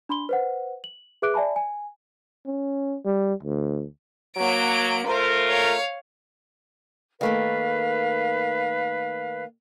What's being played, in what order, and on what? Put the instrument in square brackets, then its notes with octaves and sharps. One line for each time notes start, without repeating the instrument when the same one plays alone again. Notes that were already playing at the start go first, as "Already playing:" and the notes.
[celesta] D4 B5 C6 G7
B4 C5 F#5
F#7
G#4 B4 E5 D6 F#6 D7
D5 E5 G#5 A5 B5
G#5
[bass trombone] C#4
G3
D2
[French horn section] F#3 [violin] A#3 D7
[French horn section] A3 F4 A#4 [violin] C5
[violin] C#5 F5
[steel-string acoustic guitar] D#3 A3 A#3 [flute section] B4 F5